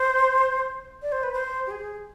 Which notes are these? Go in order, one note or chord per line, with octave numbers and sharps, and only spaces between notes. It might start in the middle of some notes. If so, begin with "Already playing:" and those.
Already playing: C5
D5
C5
B4
C5
G4
G#4